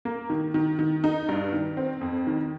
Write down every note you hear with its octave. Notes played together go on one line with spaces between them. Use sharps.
A#3
D#3
D#3
D#3
D#4
G2
D#3
C4
F2
D#3